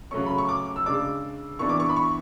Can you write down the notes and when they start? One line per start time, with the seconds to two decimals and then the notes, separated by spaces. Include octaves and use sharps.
0.11 C#3 F#3 A3 C#4 C#6
0.26 B5
0.38 C#6
0.49 D6
0.76 E6
0.85 C#3 G#3 D4 D6
1.59 E3 B3 D4 C#6
1.69 D6
1.80 C#6
1.89 B5
1.96 C#6